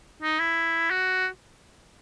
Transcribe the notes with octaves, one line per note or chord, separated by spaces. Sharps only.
D#4
E4
F#4